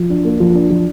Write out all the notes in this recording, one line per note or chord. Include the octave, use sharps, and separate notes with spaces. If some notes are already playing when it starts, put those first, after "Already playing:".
Already playing: F3
D4
A#3
F3
D4
F3